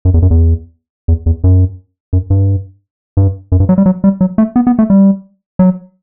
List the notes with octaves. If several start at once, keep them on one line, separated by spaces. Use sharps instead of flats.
F#2
E2
F#2
E2
E2
E2
F#2
F#2
G2
G2
F#2
G2
F#3
G3
F#3
G3
F#3
A3
B3
B3
A3
G3
F#3